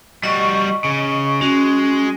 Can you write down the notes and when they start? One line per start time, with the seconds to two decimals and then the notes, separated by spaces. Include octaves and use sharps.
0.23 G3 F#4 D#5 C#6
0.84 C#3
1.41 G#3 C#4 F#4